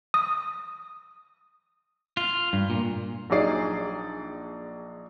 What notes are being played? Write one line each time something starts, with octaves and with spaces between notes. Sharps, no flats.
D#6
F4
G2
A#2
A#1 F#3 D#4 G#4 D5 C7